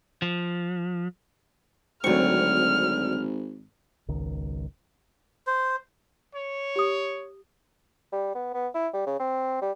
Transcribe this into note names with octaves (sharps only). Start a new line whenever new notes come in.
F3
G#1 D2 F#3 C4 C#6 F6
G#1 C#2 D#3
C5
C#5
G4 D#6
G3
B3
B3
E4
G3
C#3
C4
G3